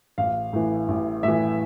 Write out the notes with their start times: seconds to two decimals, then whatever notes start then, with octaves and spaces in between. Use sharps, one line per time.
0.18 A1 F5
0.53 A2 E3
0.88 A1
1.23 A2 E3 E5